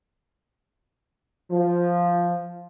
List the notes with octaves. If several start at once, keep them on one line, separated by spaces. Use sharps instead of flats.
F3